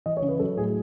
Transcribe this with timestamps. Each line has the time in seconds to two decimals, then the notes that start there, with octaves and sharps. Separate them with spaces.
0.06 E3 D#5
0.17 C#5
0.22 C#3
0.29 B4
0.39 F#3 A4
0.57 A2 G#4